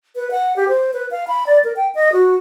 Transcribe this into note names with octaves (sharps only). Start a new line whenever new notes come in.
B4
F#5
G4
C5
B4
F5
B5
D5
A#4
G5
D#5
F#4